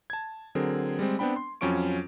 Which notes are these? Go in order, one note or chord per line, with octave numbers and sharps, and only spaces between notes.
A5 G#6
D3 F#3 C4 G#4 A#4
G3 G#3 C4
B3 C4 D4 G5 B5
C6
F2 F#3 C#4 F4 C#6 D7